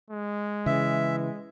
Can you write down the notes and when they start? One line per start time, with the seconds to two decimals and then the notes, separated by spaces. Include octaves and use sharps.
0.10 G#3
0.66 C#3 E3 E5